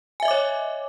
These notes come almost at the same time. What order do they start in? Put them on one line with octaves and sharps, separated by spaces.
G#5 E5 D#5 D6 C#5